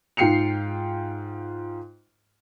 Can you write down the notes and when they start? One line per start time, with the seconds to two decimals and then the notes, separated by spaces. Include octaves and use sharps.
0.17 G#2 F4 G5 C7 C#7 F7